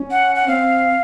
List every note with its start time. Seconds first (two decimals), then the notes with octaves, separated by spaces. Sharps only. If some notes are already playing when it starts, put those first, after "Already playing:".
Already playing: C#4
0.11 F#5
0.35 F#5
0.47 C4 F5